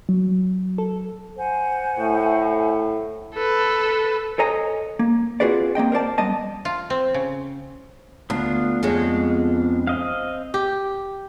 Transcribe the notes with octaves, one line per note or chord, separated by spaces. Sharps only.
F#3
A4
C5 F#5 G#5
A2
A4 B4
A4 C5 C#5 D#5 G#5 A#5
A#3
C4 F4 F#4 G#4 B4 D5
A#3 C4 D#5 G5
A#4 C5 D5 A5
F#2 G3 B3 D#5 A5
F4
C4
C#3
D2 B3 D4 F4
F2 G#3 C#4
C4 D#5 F5
G4